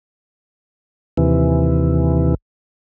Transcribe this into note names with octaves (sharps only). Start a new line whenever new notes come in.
D#2 C3 E3